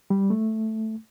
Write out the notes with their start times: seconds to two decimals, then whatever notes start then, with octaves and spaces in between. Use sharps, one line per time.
0.10 G3
0.30 A3